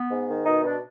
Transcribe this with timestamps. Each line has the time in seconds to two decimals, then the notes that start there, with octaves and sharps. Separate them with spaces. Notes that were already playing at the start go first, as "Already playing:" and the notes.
Already playing: B3
0.10 G#2
0.27 D#3
0.46 B2 D#4
0.63 B2 D4